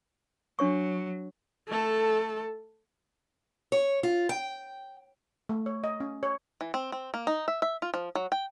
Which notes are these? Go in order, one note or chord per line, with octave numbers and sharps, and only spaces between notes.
F#3 D4 C#5 C#6
A3 A4
C#5
F4
G5
A3
C#5
D#5
C#4
C#5
E3
C4
C4
A#3
D#4
E5
E5
F4
F3
F#3
G5